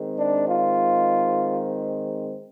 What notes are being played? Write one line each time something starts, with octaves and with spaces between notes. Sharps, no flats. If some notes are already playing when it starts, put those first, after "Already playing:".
Already playing: D#3 G#3 C4
D4
F4